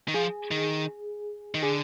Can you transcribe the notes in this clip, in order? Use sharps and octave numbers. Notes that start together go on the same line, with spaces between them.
D#3
F3 G#4
D#3
D#3
D3 G#4